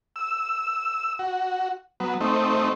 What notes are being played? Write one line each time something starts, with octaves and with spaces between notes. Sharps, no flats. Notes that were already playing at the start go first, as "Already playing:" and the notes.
E6
F#4
F#3 B3
A3 C4 D#4